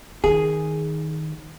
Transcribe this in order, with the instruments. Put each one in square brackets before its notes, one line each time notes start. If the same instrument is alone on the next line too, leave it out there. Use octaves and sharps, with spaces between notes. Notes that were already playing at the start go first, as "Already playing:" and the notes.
[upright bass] D#3 [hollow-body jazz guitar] G#4